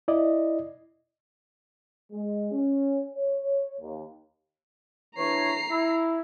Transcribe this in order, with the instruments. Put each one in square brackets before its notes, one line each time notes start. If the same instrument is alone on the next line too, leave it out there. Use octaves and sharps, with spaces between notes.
[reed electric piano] E4 D5 D#5
[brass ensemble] G#3
C#4
C#5
D#2
[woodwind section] E3 D4 C#5 [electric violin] A#5 C7
[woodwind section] E4